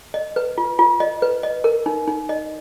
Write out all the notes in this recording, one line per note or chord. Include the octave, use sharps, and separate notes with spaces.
D#5
B4
F4
F4
D#5
B4
D#5
A#4
D#4
D#4
D#5